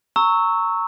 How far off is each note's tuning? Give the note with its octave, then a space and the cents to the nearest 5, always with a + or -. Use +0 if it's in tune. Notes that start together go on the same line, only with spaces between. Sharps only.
A#5 -20 C#6 +0 E6 -15